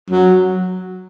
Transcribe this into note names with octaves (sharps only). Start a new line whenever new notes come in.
F#3